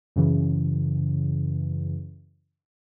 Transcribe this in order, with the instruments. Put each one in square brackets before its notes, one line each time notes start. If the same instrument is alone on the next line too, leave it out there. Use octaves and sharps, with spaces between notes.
[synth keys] F#2 C#3 E3